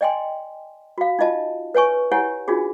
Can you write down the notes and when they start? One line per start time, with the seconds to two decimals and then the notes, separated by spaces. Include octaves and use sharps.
0.01 D5 D#5 G5 G#5 C6
0.98 F#4 F5
1.19 D#4 F4 D#5 A5
1.75 B4 C#5 G#5 C#6
2.12 E4 G4 C#5 F#5 G#5
2.48 D4 D#4 F4 F#4 G#4